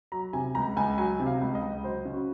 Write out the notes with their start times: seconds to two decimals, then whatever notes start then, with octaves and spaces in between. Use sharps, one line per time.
0.12 F#3 A#5
0.33 C3 G#5
0.55 C#2 A#5
0.76 C#2 G#5
0.98 F#3 G#5
1.20 C3
1.26 F5
1.41 C#2
1.55 D#5
1.62 C#2
1.84 F#3 C5
2.05 C#3
2.13 F#4